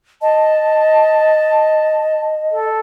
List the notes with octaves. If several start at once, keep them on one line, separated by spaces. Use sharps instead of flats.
D#5 A5
A4